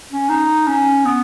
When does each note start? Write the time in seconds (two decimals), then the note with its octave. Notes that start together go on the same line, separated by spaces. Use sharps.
0.11 C#4
0.29 D#4
0.67 C#4
1.05 B3